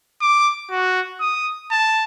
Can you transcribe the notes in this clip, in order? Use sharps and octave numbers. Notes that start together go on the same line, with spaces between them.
D6
F#4
D#6
A5